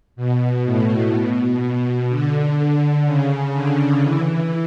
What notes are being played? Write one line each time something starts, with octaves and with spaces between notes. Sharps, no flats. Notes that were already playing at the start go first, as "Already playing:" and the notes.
B2
A2
B2
B2
D3
C#3
D3
E3